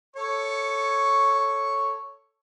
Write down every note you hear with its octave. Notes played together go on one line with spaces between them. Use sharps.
A4 C#5 C#6